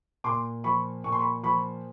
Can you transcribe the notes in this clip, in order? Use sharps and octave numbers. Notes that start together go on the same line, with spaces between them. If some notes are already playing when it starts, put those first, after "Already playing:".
A#2 C6 D6
F3 B5 C#6
A#2 C#6
C6
B5 C#6
F3 B5 C#6